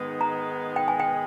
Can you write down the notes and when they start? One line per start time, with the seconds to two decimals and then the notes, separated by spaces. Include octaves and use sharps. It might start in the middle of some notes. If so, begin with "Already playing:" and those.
Already playing: G#2 D#3 G#3 B3
0.21 A#5
0.76 G5
0.88 G#5
1.00 G5